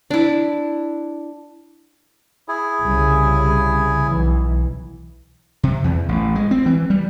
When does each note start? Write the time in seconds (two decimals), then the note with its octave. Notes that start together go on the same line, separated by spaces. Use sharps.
0.11 D4 E4
2.48 E4 G#4 G#5
2.81 C2 C#3
4.06 B1 E3
5.63 C3
5.84 E2
6.09 A1
6.35 G#3
6.51 C4
6.66 E3
6.90 G3